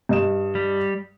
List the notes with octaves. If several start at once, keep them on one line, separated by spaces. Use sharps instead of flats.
G2 D#5 E7
G3